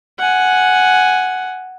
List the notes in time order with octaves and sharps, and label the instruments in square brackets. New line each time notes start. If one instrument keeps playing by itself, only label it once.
[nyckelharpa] F#5 G#5